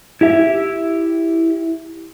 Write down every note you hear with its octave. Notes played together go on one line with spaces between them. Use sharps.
E4 G4 E5